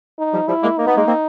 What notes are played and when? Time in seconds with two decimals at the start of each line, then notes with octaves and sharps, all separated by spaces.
0.19 D#4
0.34 F3 G3
0.48 F3 G3 E4
0.63 G#3 A#3
0.78 A#3 D#4
0.87 B3
0.97 G#3 A#3
1.07 A#3 C4